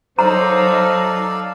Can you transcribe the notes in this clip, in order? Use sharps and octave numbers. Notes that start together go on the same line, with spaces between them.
F#3 D#4 A4 C5 D5 F5 A#5